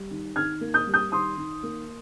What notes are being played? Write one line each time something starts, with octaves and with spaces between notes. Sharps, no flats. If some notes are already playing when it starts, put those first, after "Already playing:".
Already playing: G3
D#3
D#3 F6 G#6
A#3
D#6 G6
G3
D#6 G6
D#3 C6 D#6
D#3
A#3